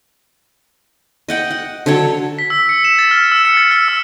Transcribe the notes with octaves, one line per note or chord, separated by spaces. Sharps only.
D#5 F#5 G5
F#5
D3 F#3 A4 C#5
B6
E6
C#7
E7
A6
F6
E6
C#7
A6
F6
E6